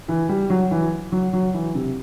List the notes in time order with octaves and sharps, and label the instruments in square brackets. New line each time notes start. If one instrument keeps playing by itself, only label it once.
[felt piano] E3
G3
F#3
E3
F#3
F#3
E3
C3